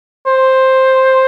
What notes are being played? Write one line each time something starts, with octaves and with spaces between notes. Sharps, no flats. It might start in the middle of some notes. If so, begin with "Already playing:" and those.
C5